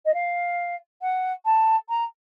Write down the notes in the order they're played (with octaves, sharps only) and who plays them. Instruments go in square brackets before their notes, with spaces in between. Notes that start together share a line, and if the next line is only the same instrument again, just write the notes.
[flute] D#5
F5
F#5
A5
A#5